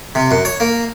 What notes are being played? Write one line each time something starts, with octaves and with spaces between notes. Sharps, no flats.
C3
F#2
C#5
A#3